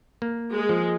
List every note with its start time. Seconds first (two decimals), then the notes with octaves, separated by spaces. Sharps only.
0.22 A#3
0.53 G#3
0.69 F3